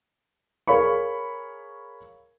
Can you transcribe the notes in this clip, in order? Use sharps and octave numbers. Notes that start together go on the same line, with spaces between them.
G#4 A#4 C#5 F5 B5 C#6